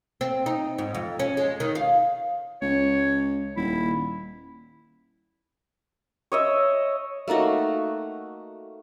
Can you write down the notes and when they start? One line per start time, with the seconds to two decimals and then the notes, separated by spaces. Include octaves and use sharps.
0.21 C4
0.46 D#4
0.78 G#2
0.95 F2
1.20 C#4
1.37 G#3
1.60 D#3
1.75 F5
2.62 C#2 C#5
3.57 D#1 E4
6.32 C#5 D#5 E5
7.28 A3 A#3 D#4 F#4